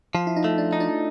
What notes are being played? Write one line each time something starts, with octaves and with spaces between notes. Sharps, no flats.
F3 F4
E4
D#4
A3
D4
D#4
D4